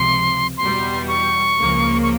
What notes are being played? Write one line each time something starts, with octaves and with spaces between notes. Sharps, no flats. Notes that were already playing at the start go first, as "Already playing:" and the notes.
Already playing: C#2 C3 F3 C6
E2 B2 G3 C6
C#6
C#2 C#3 F3 A#3
C#6